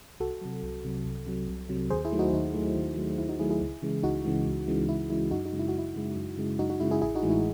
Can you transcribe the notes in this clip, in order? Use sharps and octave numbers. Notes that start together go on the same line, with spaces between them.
C2 F#4 A4
C3 F#3
C2
C3 F#3
C2
C3 F#3
C2
C3 F#3
D#2 G#4 C5
E4 G#4
D#3 F#3 A3
D#4 F#4
D#2 D#4
D#3 F#3 A3
D#2
D#3 F#3 A3
D#2 E4
D#4 F#4
D#3 F#3 A3 E4 G#4
E4 G#4
C#2
C#3 E3 G#3
C#2 D#4 F#4
C#3 E3 G#3
C#2
C#3 E3 G#3
C#2 E4
C#3 E3 G#3 E4
F#2 D#4 F#4
D#4 F#4
C#3 G#3
E4
F#4
F#2 E4
C#3 G#3
F#2
C#3 G#3
F#2 D#4 F#4
D#4 F#4
C#3 G#3 E4
E4 G#4
A1 E4 G#4
D#4 F#4
A2 E3 G#3
E4